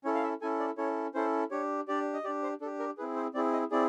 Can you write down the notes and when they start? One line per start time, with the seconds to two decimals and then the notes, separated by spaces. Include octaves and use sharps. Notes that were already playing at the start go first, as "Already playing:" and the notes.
0.04 C#4 E4 A4 C#5
0.15 F5
0.23 E5
0.41 C#4 E4 A4 G#5
0.60 D5
0.78 C#4 E4 A4 C#5
1.14 C#4 E4 A4 C5
1.51 D4 G4 C#5
1.88 D4 G4 D5
2.13 D#5
2.24 G4 D5
2.28 D4
2.43 C5
2.61 D4 A4
2.65 G4
2.79 A#4
2.98 C4 E4 G#4 B4
3.16 C5
3.34 C4 E4 G#4 D5
3.53 D#5
3.71 C4 E4 G#4 D5